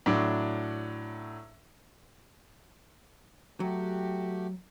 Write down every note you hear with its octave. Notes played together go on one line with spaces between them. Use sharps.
A2 F#3 D4
F#3 A3 F#4 G4